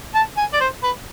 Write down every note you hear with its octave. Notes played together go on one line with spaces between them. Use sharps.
A5
G#5
D5
C5
B4